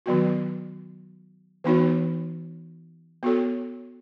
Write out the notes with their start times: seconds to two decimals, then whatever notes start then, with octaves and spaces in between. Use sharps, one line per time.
0.06 D#3 F#3 B3 F#4
1.64 E3 B3 D#4 F#4 C#5
3.23 B3 F#4 A4 C#5